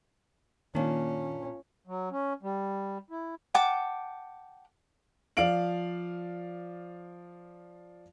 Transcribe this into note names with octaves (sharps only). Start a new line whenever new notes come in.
A#2 D#3 A#3 C#4 D4
F#3
C#4
G3
E4
F#5 G5 A5 D6
F3 D5 F5 D7 F#7